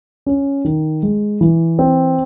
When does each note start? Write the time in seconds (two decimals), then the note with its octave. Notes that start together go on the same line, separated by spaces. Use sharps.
0.26 C#4
0.65 D#3
1.03 G#3
1.41 E3
1.79 C4